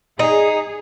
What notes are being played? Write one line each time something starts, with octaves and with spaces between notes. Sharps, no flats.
D#4 G#4